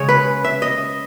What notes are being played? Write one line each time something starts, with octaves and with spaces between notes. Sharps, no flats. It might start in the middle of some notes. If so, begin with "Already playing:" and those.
Already playing: C#3 G#3 C#5
B4
E5
D#5